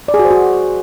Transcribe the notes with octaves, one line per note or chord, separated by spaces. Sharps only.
D5
G#4
F#4
C5
F#4